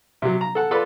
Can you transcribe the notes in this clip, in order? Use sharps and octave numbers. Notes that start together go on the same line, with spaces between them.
C3 F#3
A#5
A4 F#5 A5
F4 A4 B4 D5 B5 C6